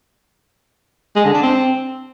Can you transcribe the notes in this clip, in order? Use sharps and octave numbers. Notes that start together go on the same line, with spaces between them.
G#3
D3
D4
C4